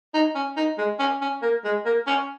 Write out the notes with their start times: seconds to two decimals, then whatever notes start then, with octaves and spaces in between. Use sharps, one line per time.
0.14 D#4
0.35 C#4
0.57 D#4
0.78 G#3
0.99 C#4
1.21 C#4
1.42 A#3
1.64 G#3
1.85 A#3
2.07 C#4